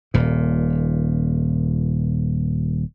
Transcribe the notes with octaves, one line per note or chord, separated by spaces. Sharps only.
D#1 A#2